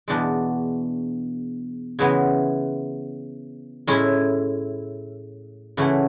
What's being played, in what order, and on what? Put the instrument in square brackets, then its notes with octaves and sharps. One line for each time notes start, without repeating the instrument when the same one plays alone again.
[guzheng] E2 B2 G#3 D4 F#4
C#3 E3 G#3 B3 F#4
A2 G#3 C#4 E4
C#3 E3 A3 C#4 F#4